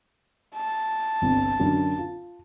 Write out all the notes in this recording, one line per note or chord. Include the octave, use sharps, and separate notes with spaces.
A5
G1 C2
F#2 D3 D4
F4